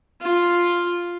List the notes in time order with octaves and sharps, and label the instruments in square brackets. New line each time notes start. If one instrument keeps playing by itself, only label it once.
[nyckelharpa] F4